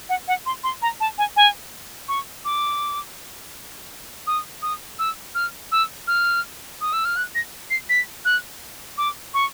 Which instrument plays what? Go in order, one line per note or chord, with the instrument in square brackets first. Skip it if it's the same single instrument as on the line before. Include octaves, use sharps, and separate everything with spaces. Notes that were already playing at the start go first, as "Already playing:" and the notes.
[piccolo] F#5
F#5
C6
C6
A#5
A5
G#5
G#5
C#6
D6
D#6
D#6
E6
F6
E6
F6
D#6
E6
F6
F#6
A#6
C7
B6
F#6
D6
C#6